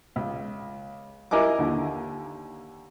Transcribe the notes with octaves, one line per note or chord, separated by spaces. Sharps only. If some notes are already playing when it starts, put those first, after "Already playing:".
C#2
E4 A#4 D#5 G#5 D6
D#2 D3